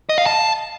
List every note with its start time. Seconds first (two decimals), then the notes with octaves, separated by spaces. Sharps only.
0.09 D#5
0.18 F5
0.26 A5